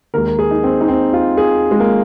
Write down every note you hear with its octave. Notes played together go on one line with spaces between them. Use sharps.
D#2 D#3 G#3 A#4
A#4
G#4
D#4
C4
D#4
C4
F4
G#4
G#3
A#3